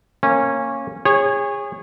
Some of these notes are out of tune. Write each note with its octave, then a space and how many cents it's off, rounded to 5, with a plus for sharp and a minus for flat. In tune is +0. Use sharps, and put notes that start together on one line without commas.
A#3 -15 C#4 -15
G#4 -30 C#5 -15